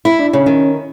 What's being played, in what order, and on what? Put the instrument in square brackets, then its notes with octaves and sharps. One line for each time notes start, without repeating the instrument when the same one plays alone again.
[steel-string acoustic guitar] E4 [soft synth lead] B5
[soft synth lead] D4
[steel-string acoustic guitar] C#3 [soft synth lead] C#4
[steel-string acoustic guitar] D#3